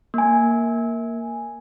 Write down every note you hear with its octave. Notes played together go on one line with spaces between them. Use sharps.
A#3 G#5